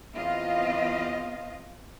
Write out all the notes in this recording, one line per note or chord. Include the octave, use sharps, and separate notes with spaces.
E2 C4 F4 D#5 F5